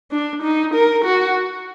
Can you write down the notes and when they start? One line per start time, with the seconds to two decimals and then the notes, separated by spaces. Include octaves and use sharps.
0.12 D4
0.43 D#4
0.74 A#4
1.05 F#4